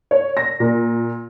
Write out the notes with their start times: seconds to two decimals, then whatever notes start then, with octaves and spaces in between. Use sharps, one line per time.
0.11 C#5
0.37 A#6
0.60 A#2